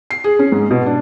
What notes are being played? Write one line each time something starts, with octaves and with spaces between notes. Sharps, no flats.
C7
G#4
C#4
G#2
B2
D4